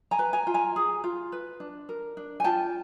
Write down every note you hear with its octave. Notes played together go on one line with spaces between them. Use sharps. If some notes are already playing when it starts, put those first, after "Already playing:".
G#5 A#5
B4
G#5 A#5
F4
G#5 A#5
G#4
F4
B4
D4
A#4
D4
G#5
F4 G5 A5